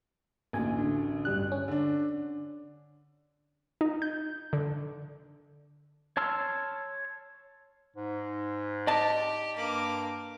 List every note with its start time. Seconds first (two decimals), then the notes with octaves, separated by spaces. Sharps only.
0.53 A1 D2 A#3 G#5
0.79 D3
1.25 G2 G3 F#6
1.52 C#4
1.68 D3 D4
3.81 D#4
4.02 G6
4.53 D3
6.17 C#5 A5 C6 E6 F6
7.97 G#2
8.87 G4 D5 D#5 A5
9.56 G2 A#3 D6